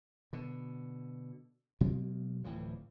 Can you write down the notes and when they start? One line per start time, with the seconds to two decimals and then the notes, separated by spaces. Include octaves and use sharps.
0.33 B2 D3
1.81 B2 F#3 G#3 A#3
2.44 D1 A2 E3 F3